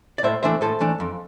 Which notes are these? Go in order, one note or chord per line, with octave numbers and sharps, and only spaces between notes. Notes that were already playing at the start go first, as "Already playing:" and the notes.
D5
A2 C5 E5
E3 A3 D4 C5 E5
A2 A4 C5
E3 A3 D4
F2